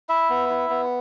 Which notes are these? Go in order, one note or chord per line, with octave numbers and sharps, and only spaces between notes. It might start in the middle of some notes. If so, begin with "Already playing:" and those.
E4 E5
B3
E4
B3